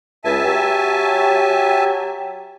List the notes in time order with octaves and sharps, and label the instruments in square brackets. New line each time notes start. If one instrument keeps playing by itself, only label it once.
[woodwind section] C#2 [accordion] E5 G#5 A5
[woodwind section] F#3 G4